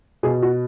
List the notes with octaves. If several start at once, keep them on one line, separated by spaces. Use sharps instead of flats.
B2 G#4
F#4